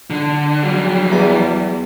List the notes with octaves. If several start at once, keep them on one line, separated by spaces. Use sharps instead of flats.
D3
F#3 G3
E2 D6